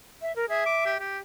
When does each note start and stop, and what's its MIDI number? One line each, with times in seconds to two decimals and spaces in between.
0.22 0.34 76
0.36 0.45 70
0.49 0.65 68
0.49 0.94 76
0.66 0.82 86
0.86 0.95 67
1.00 1.19 67